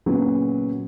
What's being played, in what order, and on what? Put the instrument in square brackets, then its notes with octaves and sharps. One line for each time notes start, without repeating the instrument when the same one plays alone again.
[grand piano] A#2 C#3 F#3 B3 C#4